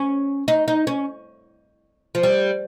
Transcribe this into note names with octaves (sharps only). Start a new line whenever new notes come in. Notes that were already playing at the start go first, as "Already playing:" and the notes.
Already playing: C#4
D#4
D#4
C#4
F3
G3